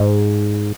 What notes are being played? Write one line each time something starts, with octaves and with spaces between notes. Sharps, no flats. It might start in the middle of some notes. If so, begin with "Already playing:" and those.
Already playing: G#2